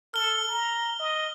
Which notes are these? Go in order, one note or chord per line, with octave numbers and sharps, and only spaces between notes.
A4 F6 G7
A#5
D#5